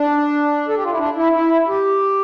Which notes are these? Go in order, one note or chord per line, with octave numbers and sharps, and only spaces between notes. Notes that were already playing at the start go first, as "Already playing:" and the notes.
Already playing: D4
A4
G4
F4
E4
D4
E4
E4
G4